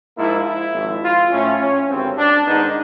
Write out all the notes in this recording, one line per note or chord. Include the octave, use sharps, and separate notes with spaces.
G#2 F3 A#3 E4
E4
G#1 G#2 F3
F4
A2 F3 A3 C#4
C#4
G#1 G2 D3 G3 C4
D4
G#2 D#3 G#3 B3 D#4